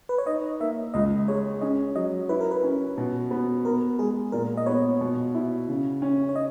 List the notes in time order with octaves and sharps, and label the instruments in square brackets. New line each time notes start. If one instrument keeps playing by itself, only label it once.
[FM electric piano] B4
C#5
[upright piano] D#4 [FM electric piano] D#5
[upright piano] A#3 [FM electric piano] E5
[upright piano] C#2 [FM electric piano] D#5
[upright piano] G#3 [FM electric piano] C#5
[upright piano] C#4 [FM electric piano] D#5
[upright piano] F#3 [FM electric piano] D#5
[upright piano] E4 [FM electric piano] B4
[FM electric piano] A#4
B4
[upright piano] C#4
B2
B3
[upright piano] B3 [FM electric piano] A#4
[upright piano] G#3 [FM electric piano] G#4
[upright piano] A#2 [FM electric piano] A#4
[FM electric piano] D#5
[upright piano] B3 [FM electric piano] C#5
[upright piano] B2
E4
C#3
C#4
[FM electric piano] C#5
D#5